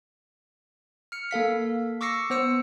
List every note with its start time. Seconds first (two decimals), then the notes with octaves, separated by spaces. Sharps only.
1.12 F6 C#7
1.31 A#3 A4 F5 B6
2.01 C#6 D6 E6 A#6 C7 C#7
2.30 B3 C5 E6 C#7